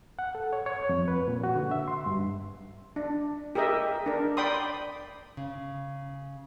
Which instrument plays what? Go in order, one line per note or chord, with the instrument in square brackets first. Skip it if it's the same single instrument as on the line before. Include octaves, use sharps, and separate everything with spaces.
[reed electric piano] F#5
A4
C#5
C#5
F2
B4
A#2
F#4
D3
E5
C6
G2
[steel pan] D4
G4 G#4 A#4 D#5 E5
D4 A#4
D5 G5 B5 C6 D#6
[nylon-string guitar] C#3